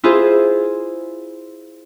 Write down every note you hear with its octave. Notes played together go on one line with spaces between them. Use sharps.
E4 F4 G#4 C5